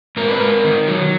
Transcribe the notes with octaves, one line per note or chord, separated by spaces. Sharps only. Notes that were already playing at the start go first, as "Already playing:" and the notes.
G#2 A#4
B4
G#2 A#4
D#3
F#3